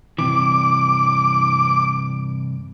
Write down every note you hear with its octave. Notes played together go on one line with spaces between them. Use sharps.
G2 C3 E3 D6